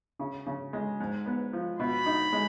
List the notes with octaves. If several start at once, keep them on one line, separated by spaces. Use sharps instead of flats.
C#3
C#3
G#3
G#2
B3
F3
B2 B5
D#4
G#3